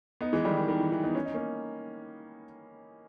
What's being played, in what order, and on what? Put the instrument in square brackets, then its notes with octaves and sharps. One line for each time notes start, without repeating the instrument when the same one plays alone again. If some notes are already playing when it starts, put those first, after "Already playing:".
[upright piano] B3 D#4
E3 G#3
D#3 G3
D#3
D#3
E3
E3
B3 D#4
C#4
D#4
A#3 C#4